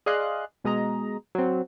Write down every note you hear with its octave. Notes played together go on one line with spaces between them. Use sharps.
G#4 D5 D#5 F5 C6 F#6
B2 G#3 D#5 A#5
F#3 C4